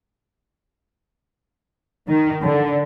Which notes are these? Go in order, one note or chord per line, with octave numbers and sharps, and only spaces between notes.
D#3
D3